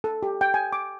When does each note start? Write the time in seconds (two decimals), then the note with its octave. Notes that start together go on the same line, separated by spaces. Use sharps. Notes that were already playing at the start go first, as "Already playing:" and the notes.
0.04 A4
0.23 G4
0.41 G5
0.54 G#5
0.73 D6